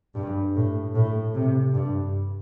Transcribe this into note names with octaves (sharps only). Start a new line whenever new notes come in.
G2
A2
A2
C3
G2